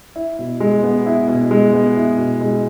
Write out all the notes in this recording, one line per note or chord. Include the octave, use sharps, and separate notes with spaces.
E4
B2
G#3
B3
E4
B2
G#3
B3
E4
B2
G#3